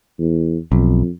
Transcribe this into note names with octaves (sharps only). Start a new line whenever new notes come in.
E2
B1 F2